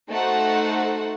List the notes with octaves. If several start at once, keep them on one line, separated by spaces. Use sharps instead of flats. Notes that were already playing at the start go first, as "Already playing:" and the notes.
A3 D#4 F#4 C5 F#5